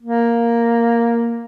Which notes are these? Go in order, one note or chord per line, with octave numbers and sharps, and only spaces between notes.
A#3